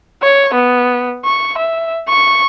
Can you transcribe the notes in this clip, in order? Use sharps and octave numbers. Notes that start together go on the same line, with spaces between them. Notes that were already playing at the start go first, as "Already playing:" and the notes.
C#5
B3
C#6
E5
C#6